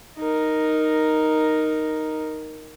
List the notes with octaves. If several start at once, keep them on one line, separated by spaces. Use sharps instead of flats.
D#4 A#4